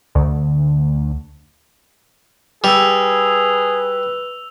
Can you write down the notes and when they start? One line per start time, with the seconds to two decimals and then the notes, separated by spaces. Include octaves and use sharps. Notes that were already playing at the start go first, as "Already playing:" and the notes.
0.15 D2
2.64 G3 G#4 B4 E6 F7